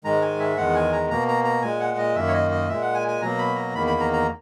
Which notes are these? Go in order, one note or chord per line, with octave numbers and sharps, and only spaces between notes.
G#2 D#3 G#3 A#5
G#5
E5
E2 D#3 G#3 F#5
G#5
A#5
B2 A#3 A#5
A#5
A#5
A#2 G#3 G#5
F#5
D#5
F#2 D#3 A#3 E5
C#5
D#5
D#5
A#2 G#3 E5
F#5
G#5
G#5
B2 F#3 A#3 A#5
B5
A#5
E2 D#3 A#3 B5
B5
A#5
A#5